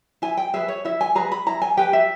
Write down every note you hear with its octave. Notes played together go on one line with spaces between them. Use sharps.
E4 G#5
G5
G#4 B4 E5
C#5
E4 E5
G#5
G#4 B4 A#5
B5
E4 A#5
G#5
G4 B4 G5
E5